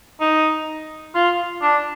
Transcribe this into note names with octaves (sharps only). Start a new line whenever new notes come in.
D#4
F4
D4